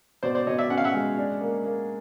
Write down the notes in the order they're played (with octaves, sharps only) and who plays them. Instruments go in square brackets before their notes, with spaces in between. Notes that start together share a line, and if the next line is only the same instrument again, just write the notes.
[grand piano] B2 [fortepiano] C5 D5
[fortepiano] C5 D5
[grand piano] B2 [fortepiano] C#5 D#5
[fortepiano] D5 E5
[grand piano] C#4 [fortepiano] F#5
[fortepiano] F5
E5 F#5
[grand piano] G#3
D4
A#3
A#3